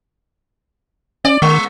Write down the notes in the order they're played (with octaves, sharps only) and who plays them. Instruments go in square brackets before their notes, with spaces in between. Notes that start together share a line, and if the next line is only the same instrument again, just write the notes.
[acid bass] C#4 [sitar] D5
[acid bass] D#3 [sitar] G#3